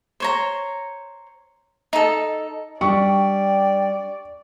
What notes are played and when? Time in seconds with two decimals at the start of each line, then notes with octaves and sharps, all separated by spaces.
0.20 C5 C#5 A#5
1.93 D#4 A4
2.81 G3 D4 D5 G5 C#6